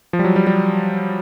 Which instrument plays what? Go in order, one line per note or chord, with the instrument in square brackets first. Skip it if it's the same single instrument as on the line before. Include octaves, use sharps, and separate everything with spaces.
[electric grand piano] F3
G3
F#3
G3
G3